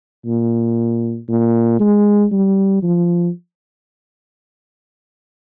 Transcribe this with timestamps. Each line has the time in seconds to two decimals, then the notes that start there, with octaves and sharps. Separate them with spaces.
0.26 A#2
1.29 A#2
1.80 G#3
2.32 G3
2.83 F3